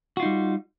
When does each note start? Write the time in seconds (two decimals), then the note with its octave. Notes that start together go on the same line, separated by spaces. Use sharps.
0.17 F#4
0.20 F4
0.23 D#4
0.25 G3